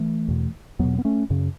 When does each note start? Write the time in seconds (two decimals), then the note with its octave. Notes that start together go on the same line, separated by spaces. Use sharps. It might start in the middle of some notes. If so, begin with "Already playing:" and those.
Already playing: E3 A3
0.28 E2 B2
0.79 E2 B2 F#3 B3
0.98 B3
1.05 A3 C#4
1.30 F#2 C#3